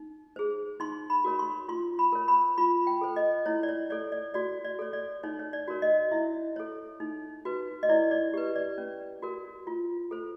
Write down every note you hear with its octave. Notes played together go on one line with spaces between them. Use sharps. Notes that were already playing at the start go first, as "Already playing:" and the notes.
Already playing: D#4
G#4 C5
D#4 C6
B5
F#4 A#4 C#5
C6
F4 C6
B5
A#4 C#5
B5
F4 B5
G5
A4 C5
D#5
E4 C#5
D5
C#5
A4 C#5 D5
D5
F#4 D5
D5
A4 C#5
D5
D#4 C#5
C#5
D5
F#4 A#4 C#5
D#5
E4 E5
A4 C#5
D#4
F#4 B4
D#5
E4 D5
D5
G4 B4
D5
C#4
F#4 A#4
F4
A4 C5